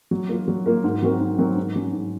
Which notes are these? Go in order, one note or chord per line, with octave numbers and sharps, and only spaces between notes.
F#3
A#3 F4 A#4
F#3
A#3 F4 A#4
G#2
F#3 C4 F#4 A#4
G#2
F#3 C4 F#4 A#4
G#2
F#3 C#4
G#2